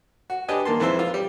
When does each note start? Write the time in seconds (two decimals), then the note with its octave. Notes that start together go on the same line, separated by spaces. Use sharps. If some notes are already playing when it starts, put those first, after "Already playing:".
0.30 F#4
0.48 D4 G4 B4 D#5 G#5
0.65 D#3 A#3 A5 C6
0.80 F2 E3 G#3 C5 E5 C6
0.99 F4
1.14 G3